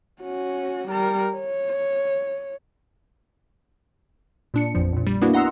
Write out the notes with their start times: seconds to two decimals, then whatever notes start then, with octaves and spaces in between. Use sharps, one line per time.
0.22 C#4 F#4
0.88 G3 A#4
1.36 C#5
4.54 A#2 D4 C#7
4.75 A1 F2 F3
4.92 A#1 A#2
5.07 G3
5.22 A#3 B3 D4 E4 F#4
5.34 D#5 F#5 A#5 C6 E6